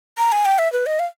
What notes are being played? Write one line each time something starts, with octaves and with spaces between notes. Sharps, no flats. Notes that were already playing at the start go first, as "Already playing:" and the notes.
A#5
G#5
G5
E5
B4
D#5
F5